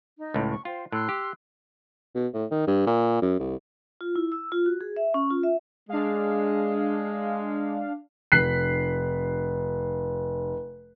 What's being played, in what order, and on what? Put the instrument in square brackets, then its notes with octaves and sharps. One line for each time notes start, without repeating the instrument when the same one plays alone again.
[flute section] D#4
[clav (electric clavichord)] C#2 A2
[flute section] C#6
[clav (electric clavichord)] F4 [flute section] C5 G5
[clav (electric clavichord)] A2 [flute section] C6 E6 F#6
[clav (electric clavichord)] G4
[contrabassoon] B2
A2
D#3
G2
A#2
F#2
C2
[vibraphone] F4
E4
E6
F4
F#4
G#4
E5
C#4
F4
E5
[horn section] G#3 [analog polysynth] D4 F5
[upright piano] F1 F#6 B6 C7